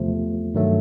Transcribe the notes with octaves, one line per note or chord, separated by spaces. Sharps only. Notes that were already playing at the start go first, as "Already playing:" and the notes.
Already playing: E2 C3 F3 A3
G2 D#3 F#3 A3